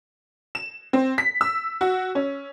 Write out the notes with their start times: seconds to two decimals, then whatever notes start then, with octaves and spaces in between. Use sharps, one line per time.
0.55 E7
0.93 C4
1.18 B6
1.41 E6
1.81 F#4
2.15 C#4